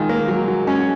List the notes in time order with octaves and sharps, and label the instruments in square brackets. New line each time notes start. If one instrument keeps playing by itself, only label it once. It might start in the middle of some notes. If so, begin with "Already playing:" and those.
Already playing: [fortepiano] D#3 F4 [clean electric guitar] G#3
[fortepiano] A#3
F#3
F#3
[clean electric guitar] G#3 [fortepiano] C#4